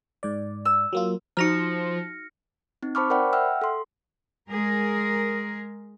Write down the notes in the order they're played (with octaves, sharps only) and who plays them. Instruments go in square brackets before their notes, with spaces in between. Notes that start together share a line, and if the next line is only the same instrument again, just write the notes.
[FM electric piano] G#2 D5
[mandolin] E6
[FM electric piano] F#3 A#3 F4
[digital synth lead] F3 [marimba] D#4 F#4 A#5 [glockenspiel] F6 A#6 C#7
[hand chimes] C4 D#4
C5 A5 B5 C#6 D6 F6
A#4 C5 D5 F#5 G5 B5
E5 F#5 G5 E6 F6
A4 C6
[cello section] G#3 G#4 A#4